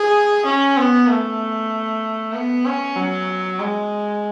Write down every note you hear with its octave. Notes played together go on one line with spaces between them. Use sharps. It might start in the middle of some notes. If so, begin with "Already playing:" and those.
Already playing: G#4
C#4
B3
A3
B3
C#4
F#3
G#3